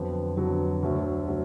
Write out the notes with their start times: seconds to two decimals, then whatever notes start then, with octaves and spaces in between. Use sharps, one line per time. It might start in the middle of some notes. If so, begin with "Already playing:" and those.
Already playing: F2 D3 F#3 B3
0.37 F2 D3 F#3 B3
0.83 D2 D3 F#3 A3
1.28 D3 F#3 A3